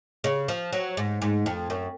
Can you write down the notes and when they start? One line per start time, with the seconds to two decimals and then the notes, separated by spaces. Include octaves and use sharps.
0.24 C#3
0.48 F3
0.73 F#3
0.97 G#2
1.22 G#2
1.46 F2
1.70 F#2